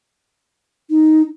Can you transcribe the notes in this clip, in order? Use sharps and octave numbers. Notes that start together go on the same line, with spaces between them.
D#4